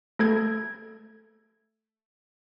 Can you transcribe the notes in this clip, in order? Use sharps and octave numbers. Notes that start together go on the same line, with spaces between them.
A3 A4 G#6